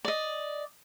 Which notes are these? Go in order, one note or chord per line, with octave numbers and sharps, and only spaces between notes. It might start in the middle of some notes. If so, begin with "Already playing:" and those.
D5 D#5